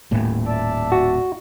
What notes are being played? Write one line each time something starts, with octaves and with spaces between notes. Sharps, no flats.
D#1 A2
D5 E5 A5
F#4